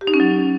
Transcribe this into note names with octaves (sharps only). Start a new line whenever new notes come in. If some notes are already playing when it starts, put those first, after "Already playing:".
G4
D#4
C#4
F#3